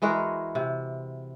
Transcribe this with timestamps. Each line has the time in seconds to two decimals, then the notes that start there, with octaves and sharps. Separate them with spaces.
0.02 E3 G#3 F#4 A#4
0.55 C3